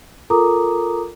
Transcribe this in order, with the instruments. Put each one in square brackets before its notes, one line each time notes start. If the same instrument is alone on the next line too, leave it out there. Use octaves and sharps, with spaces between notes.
[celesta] F4 A4 A#4 A#5 D6 D#6